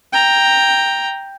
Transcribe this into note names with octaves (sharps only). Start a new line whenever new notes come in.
G5 A#5